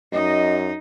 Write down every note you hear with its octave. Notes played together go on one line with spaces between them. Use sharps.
F#2 D#4 D#5